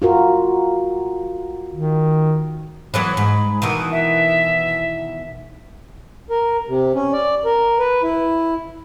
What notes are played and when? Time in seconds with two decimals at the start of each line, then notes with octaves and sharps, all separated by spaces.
0.02 F4 F#4 A#4
1.72 D#3
2.94 E3 F#3 B3 B5
3.17 G#2
3.62 B2 D#3 E3
3.92 E5
6.30 A#4
6.68 C3
6.95 C#4
7.13 D5
7.45 A#4
7.79 B4
8.03 E4